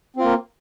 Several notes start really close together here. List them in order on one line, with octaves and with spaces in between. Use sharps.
C4 F4 A#3